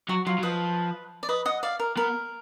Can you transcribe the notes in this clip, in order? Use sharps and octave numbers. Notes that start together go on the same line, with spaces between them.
F#3 F#4
F#3 F4
F#3
F3 B4 D#5
D5
B4 D#5
D#5 F#5
D5 F5
A#4
B3 A#4